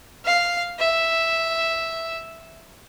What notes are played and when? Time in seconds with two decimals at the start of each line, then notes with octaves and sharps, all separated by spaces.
0.25 F5
0.79 E5